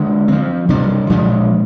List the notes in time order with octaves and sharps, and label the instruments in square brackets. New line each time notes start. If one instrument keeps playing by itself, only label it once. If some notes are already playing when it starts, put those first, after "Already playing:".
Already playing: [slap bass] D3 G#3 D4
F3 C4
C3 G3 D4
A#2 F3 G#3 D4